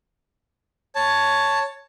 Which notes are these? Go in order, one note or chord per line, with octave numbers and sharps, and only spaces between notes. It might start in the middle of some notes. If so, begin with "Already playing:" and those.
C#5 A5